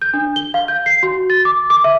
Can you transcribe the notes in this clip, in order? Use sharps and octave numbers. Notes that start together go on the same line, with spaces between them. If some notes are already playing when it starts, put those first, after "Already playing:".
G6
D4
G7
F5
G6
C7
F#4
A6
D6
D6
E5